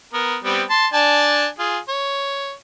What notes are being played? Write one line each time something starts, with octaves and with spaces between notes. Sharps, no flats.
B3 A#4
G3 B3 C4
A5 C6
D4 G#5 A5
F4 G#4
C#5